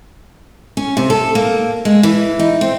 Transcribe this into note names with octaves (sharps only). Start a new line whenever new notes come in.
C#4
C3
A4
A#3
G#3
E3
D#4
C4